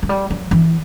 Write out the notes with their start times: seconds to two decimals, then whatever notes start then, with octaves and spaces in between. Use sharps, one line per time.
0.03 F#3
0.09 G3
0.30 F#3
0.51 E3